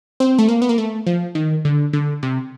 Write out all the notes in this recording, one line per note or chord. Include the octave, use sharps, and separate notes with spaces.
C4
A3
A#3
B3
A#3
A3
F3
D#3
D3
D3
C3